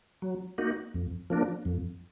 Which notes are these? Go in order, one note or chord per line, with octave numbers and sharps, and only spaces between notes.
F#3
A#3 D#4 F#4
F2
F3 A#3 D4
F2